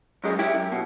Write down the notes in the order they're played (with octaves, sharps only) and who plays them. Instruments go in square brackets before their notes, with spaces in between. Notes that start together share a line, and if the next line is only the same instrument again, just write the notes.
[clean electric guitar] F#2 G#3
E4 G4
F#2
B2